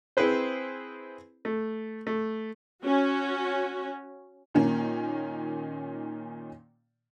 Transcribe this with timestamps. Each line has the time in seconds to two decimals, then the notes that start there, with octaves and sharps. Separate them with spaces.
0.17 C4 E4 G#4 B4 C5
1.45 A3
2.07 A3
2.84 C#4 F#4
4.55 A#2 D#3 A#3 C#4